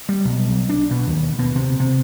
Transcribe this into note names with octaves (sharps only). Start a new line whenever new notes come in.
G3
B1
B1
D4
B2
D#2
B2
C3
C3